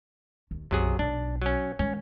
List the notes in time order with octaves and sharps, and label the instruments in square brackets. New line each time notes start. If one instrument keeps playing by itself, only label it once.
[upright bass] D#2
[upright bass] B1 F#2 [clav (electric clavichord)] C3 F#3 G#4
[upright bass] B1 [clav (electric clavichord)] D4
[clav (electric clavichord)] F#3 C#4
[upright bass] D#3 G#3 [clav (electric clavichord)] C#4